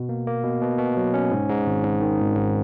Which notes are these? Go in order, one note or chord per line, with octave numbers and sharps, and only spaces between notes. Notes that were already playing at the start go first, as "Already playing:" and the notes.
Already playing: B2
A#3
A#3
B2
B2
B2
F#3
C#4
G#2
G#2
G#1
G#2
D#3
G#1
G#2